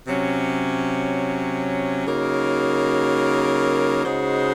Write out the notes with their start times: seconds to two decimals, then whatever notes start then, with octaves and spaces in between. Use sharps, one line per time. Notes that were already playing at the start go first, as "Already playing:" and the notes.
0.07 C3 F#3 C#4
2.06 C#3 F#3 A#3 D#4 A#4
4.05 C#3 G#3 D#4 F#4 C5